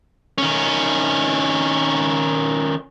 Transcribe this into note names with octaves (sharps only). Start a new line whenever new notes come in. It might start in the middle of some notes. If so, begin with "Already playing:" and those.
D#3 C#4